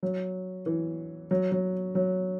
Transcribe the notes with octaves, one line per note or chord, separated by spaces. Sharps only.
F#3
E3
F#3
F#3
F#3